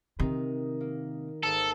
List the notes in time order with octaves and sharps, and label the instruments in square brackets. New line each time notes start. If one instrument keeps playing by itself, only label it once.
[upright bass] C3 [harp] D#3 D#4
[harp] A#3
[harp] G#1 G#4 A#5 [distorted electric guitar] A4